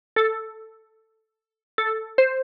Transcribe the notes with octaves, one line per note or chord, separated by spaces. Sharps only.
A4
A4
C5